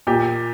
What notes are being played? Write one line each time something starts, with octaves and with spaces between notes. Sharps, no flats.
A#2 G4